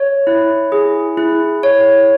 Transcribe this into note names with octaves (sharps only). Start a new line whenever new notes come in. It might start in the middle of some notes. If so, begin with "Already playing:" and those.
Already playing: C#5
E4
G#4
E4
C#5